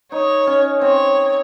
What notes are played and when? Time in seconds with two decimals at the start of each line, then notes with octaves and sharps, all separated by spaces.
0.12 D#4 C#5
0.47 C#4
0.81 C4 C#5